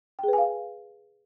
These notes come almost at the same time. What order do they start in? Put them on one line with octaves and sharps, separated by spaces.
G5 G#4 B4 G#5 F5